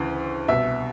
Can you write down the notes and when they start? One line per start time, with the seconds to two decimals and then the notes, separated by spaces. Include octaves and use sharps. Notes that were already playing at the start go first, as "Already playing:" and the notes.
Already playing: D2 C#3 E3
0.48 C2 B2 E5